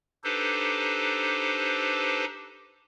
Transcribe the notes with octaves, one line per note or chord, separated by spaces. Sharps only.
D4 D#4 G4 A4 B4 C5